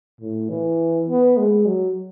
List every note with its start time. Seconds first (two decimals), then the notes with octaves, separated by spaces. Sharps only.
0.21 A2
0.50 E3
1.08 B3
1.37 G#3
1.66 F#3